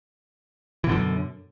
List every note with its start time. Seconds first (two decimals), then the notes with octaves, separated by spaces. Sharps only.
0.84 E3
0.87 B2
0.89 D3
0.92 F#2